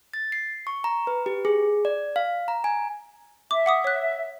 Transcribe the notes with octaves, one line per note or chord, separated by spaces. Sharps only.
A6
C7
C#6
A#5
B4
G4
G#4
D5
F5
A#5
G#5
E5 D6
F#5 D6 D#6
C#5 F#6